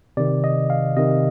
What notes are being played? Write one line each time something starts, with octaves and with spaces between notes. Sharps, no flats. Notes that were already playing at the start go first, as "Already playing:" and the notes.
C3 D#3 D5
D#5
F5
C3 D#3 D#5